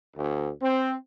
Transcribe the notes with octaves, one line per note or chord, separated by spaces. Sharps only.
D2
C4